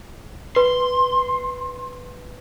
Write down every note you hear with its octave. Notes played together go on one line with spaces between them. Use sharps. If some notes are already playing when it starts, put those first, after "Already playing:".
B4 C6